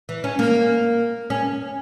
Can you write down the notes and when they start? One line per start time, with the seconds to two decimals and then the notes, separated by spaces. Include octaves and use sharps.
0.09 E3
0.24 C#4
0.39 A#3
1.30 C#4